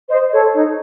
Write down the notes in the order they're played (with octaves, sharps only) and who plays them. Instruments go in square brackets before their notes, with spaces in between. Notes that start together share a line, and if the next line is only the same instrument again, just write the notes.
[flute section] C5 D#5
A4 C#5
D#4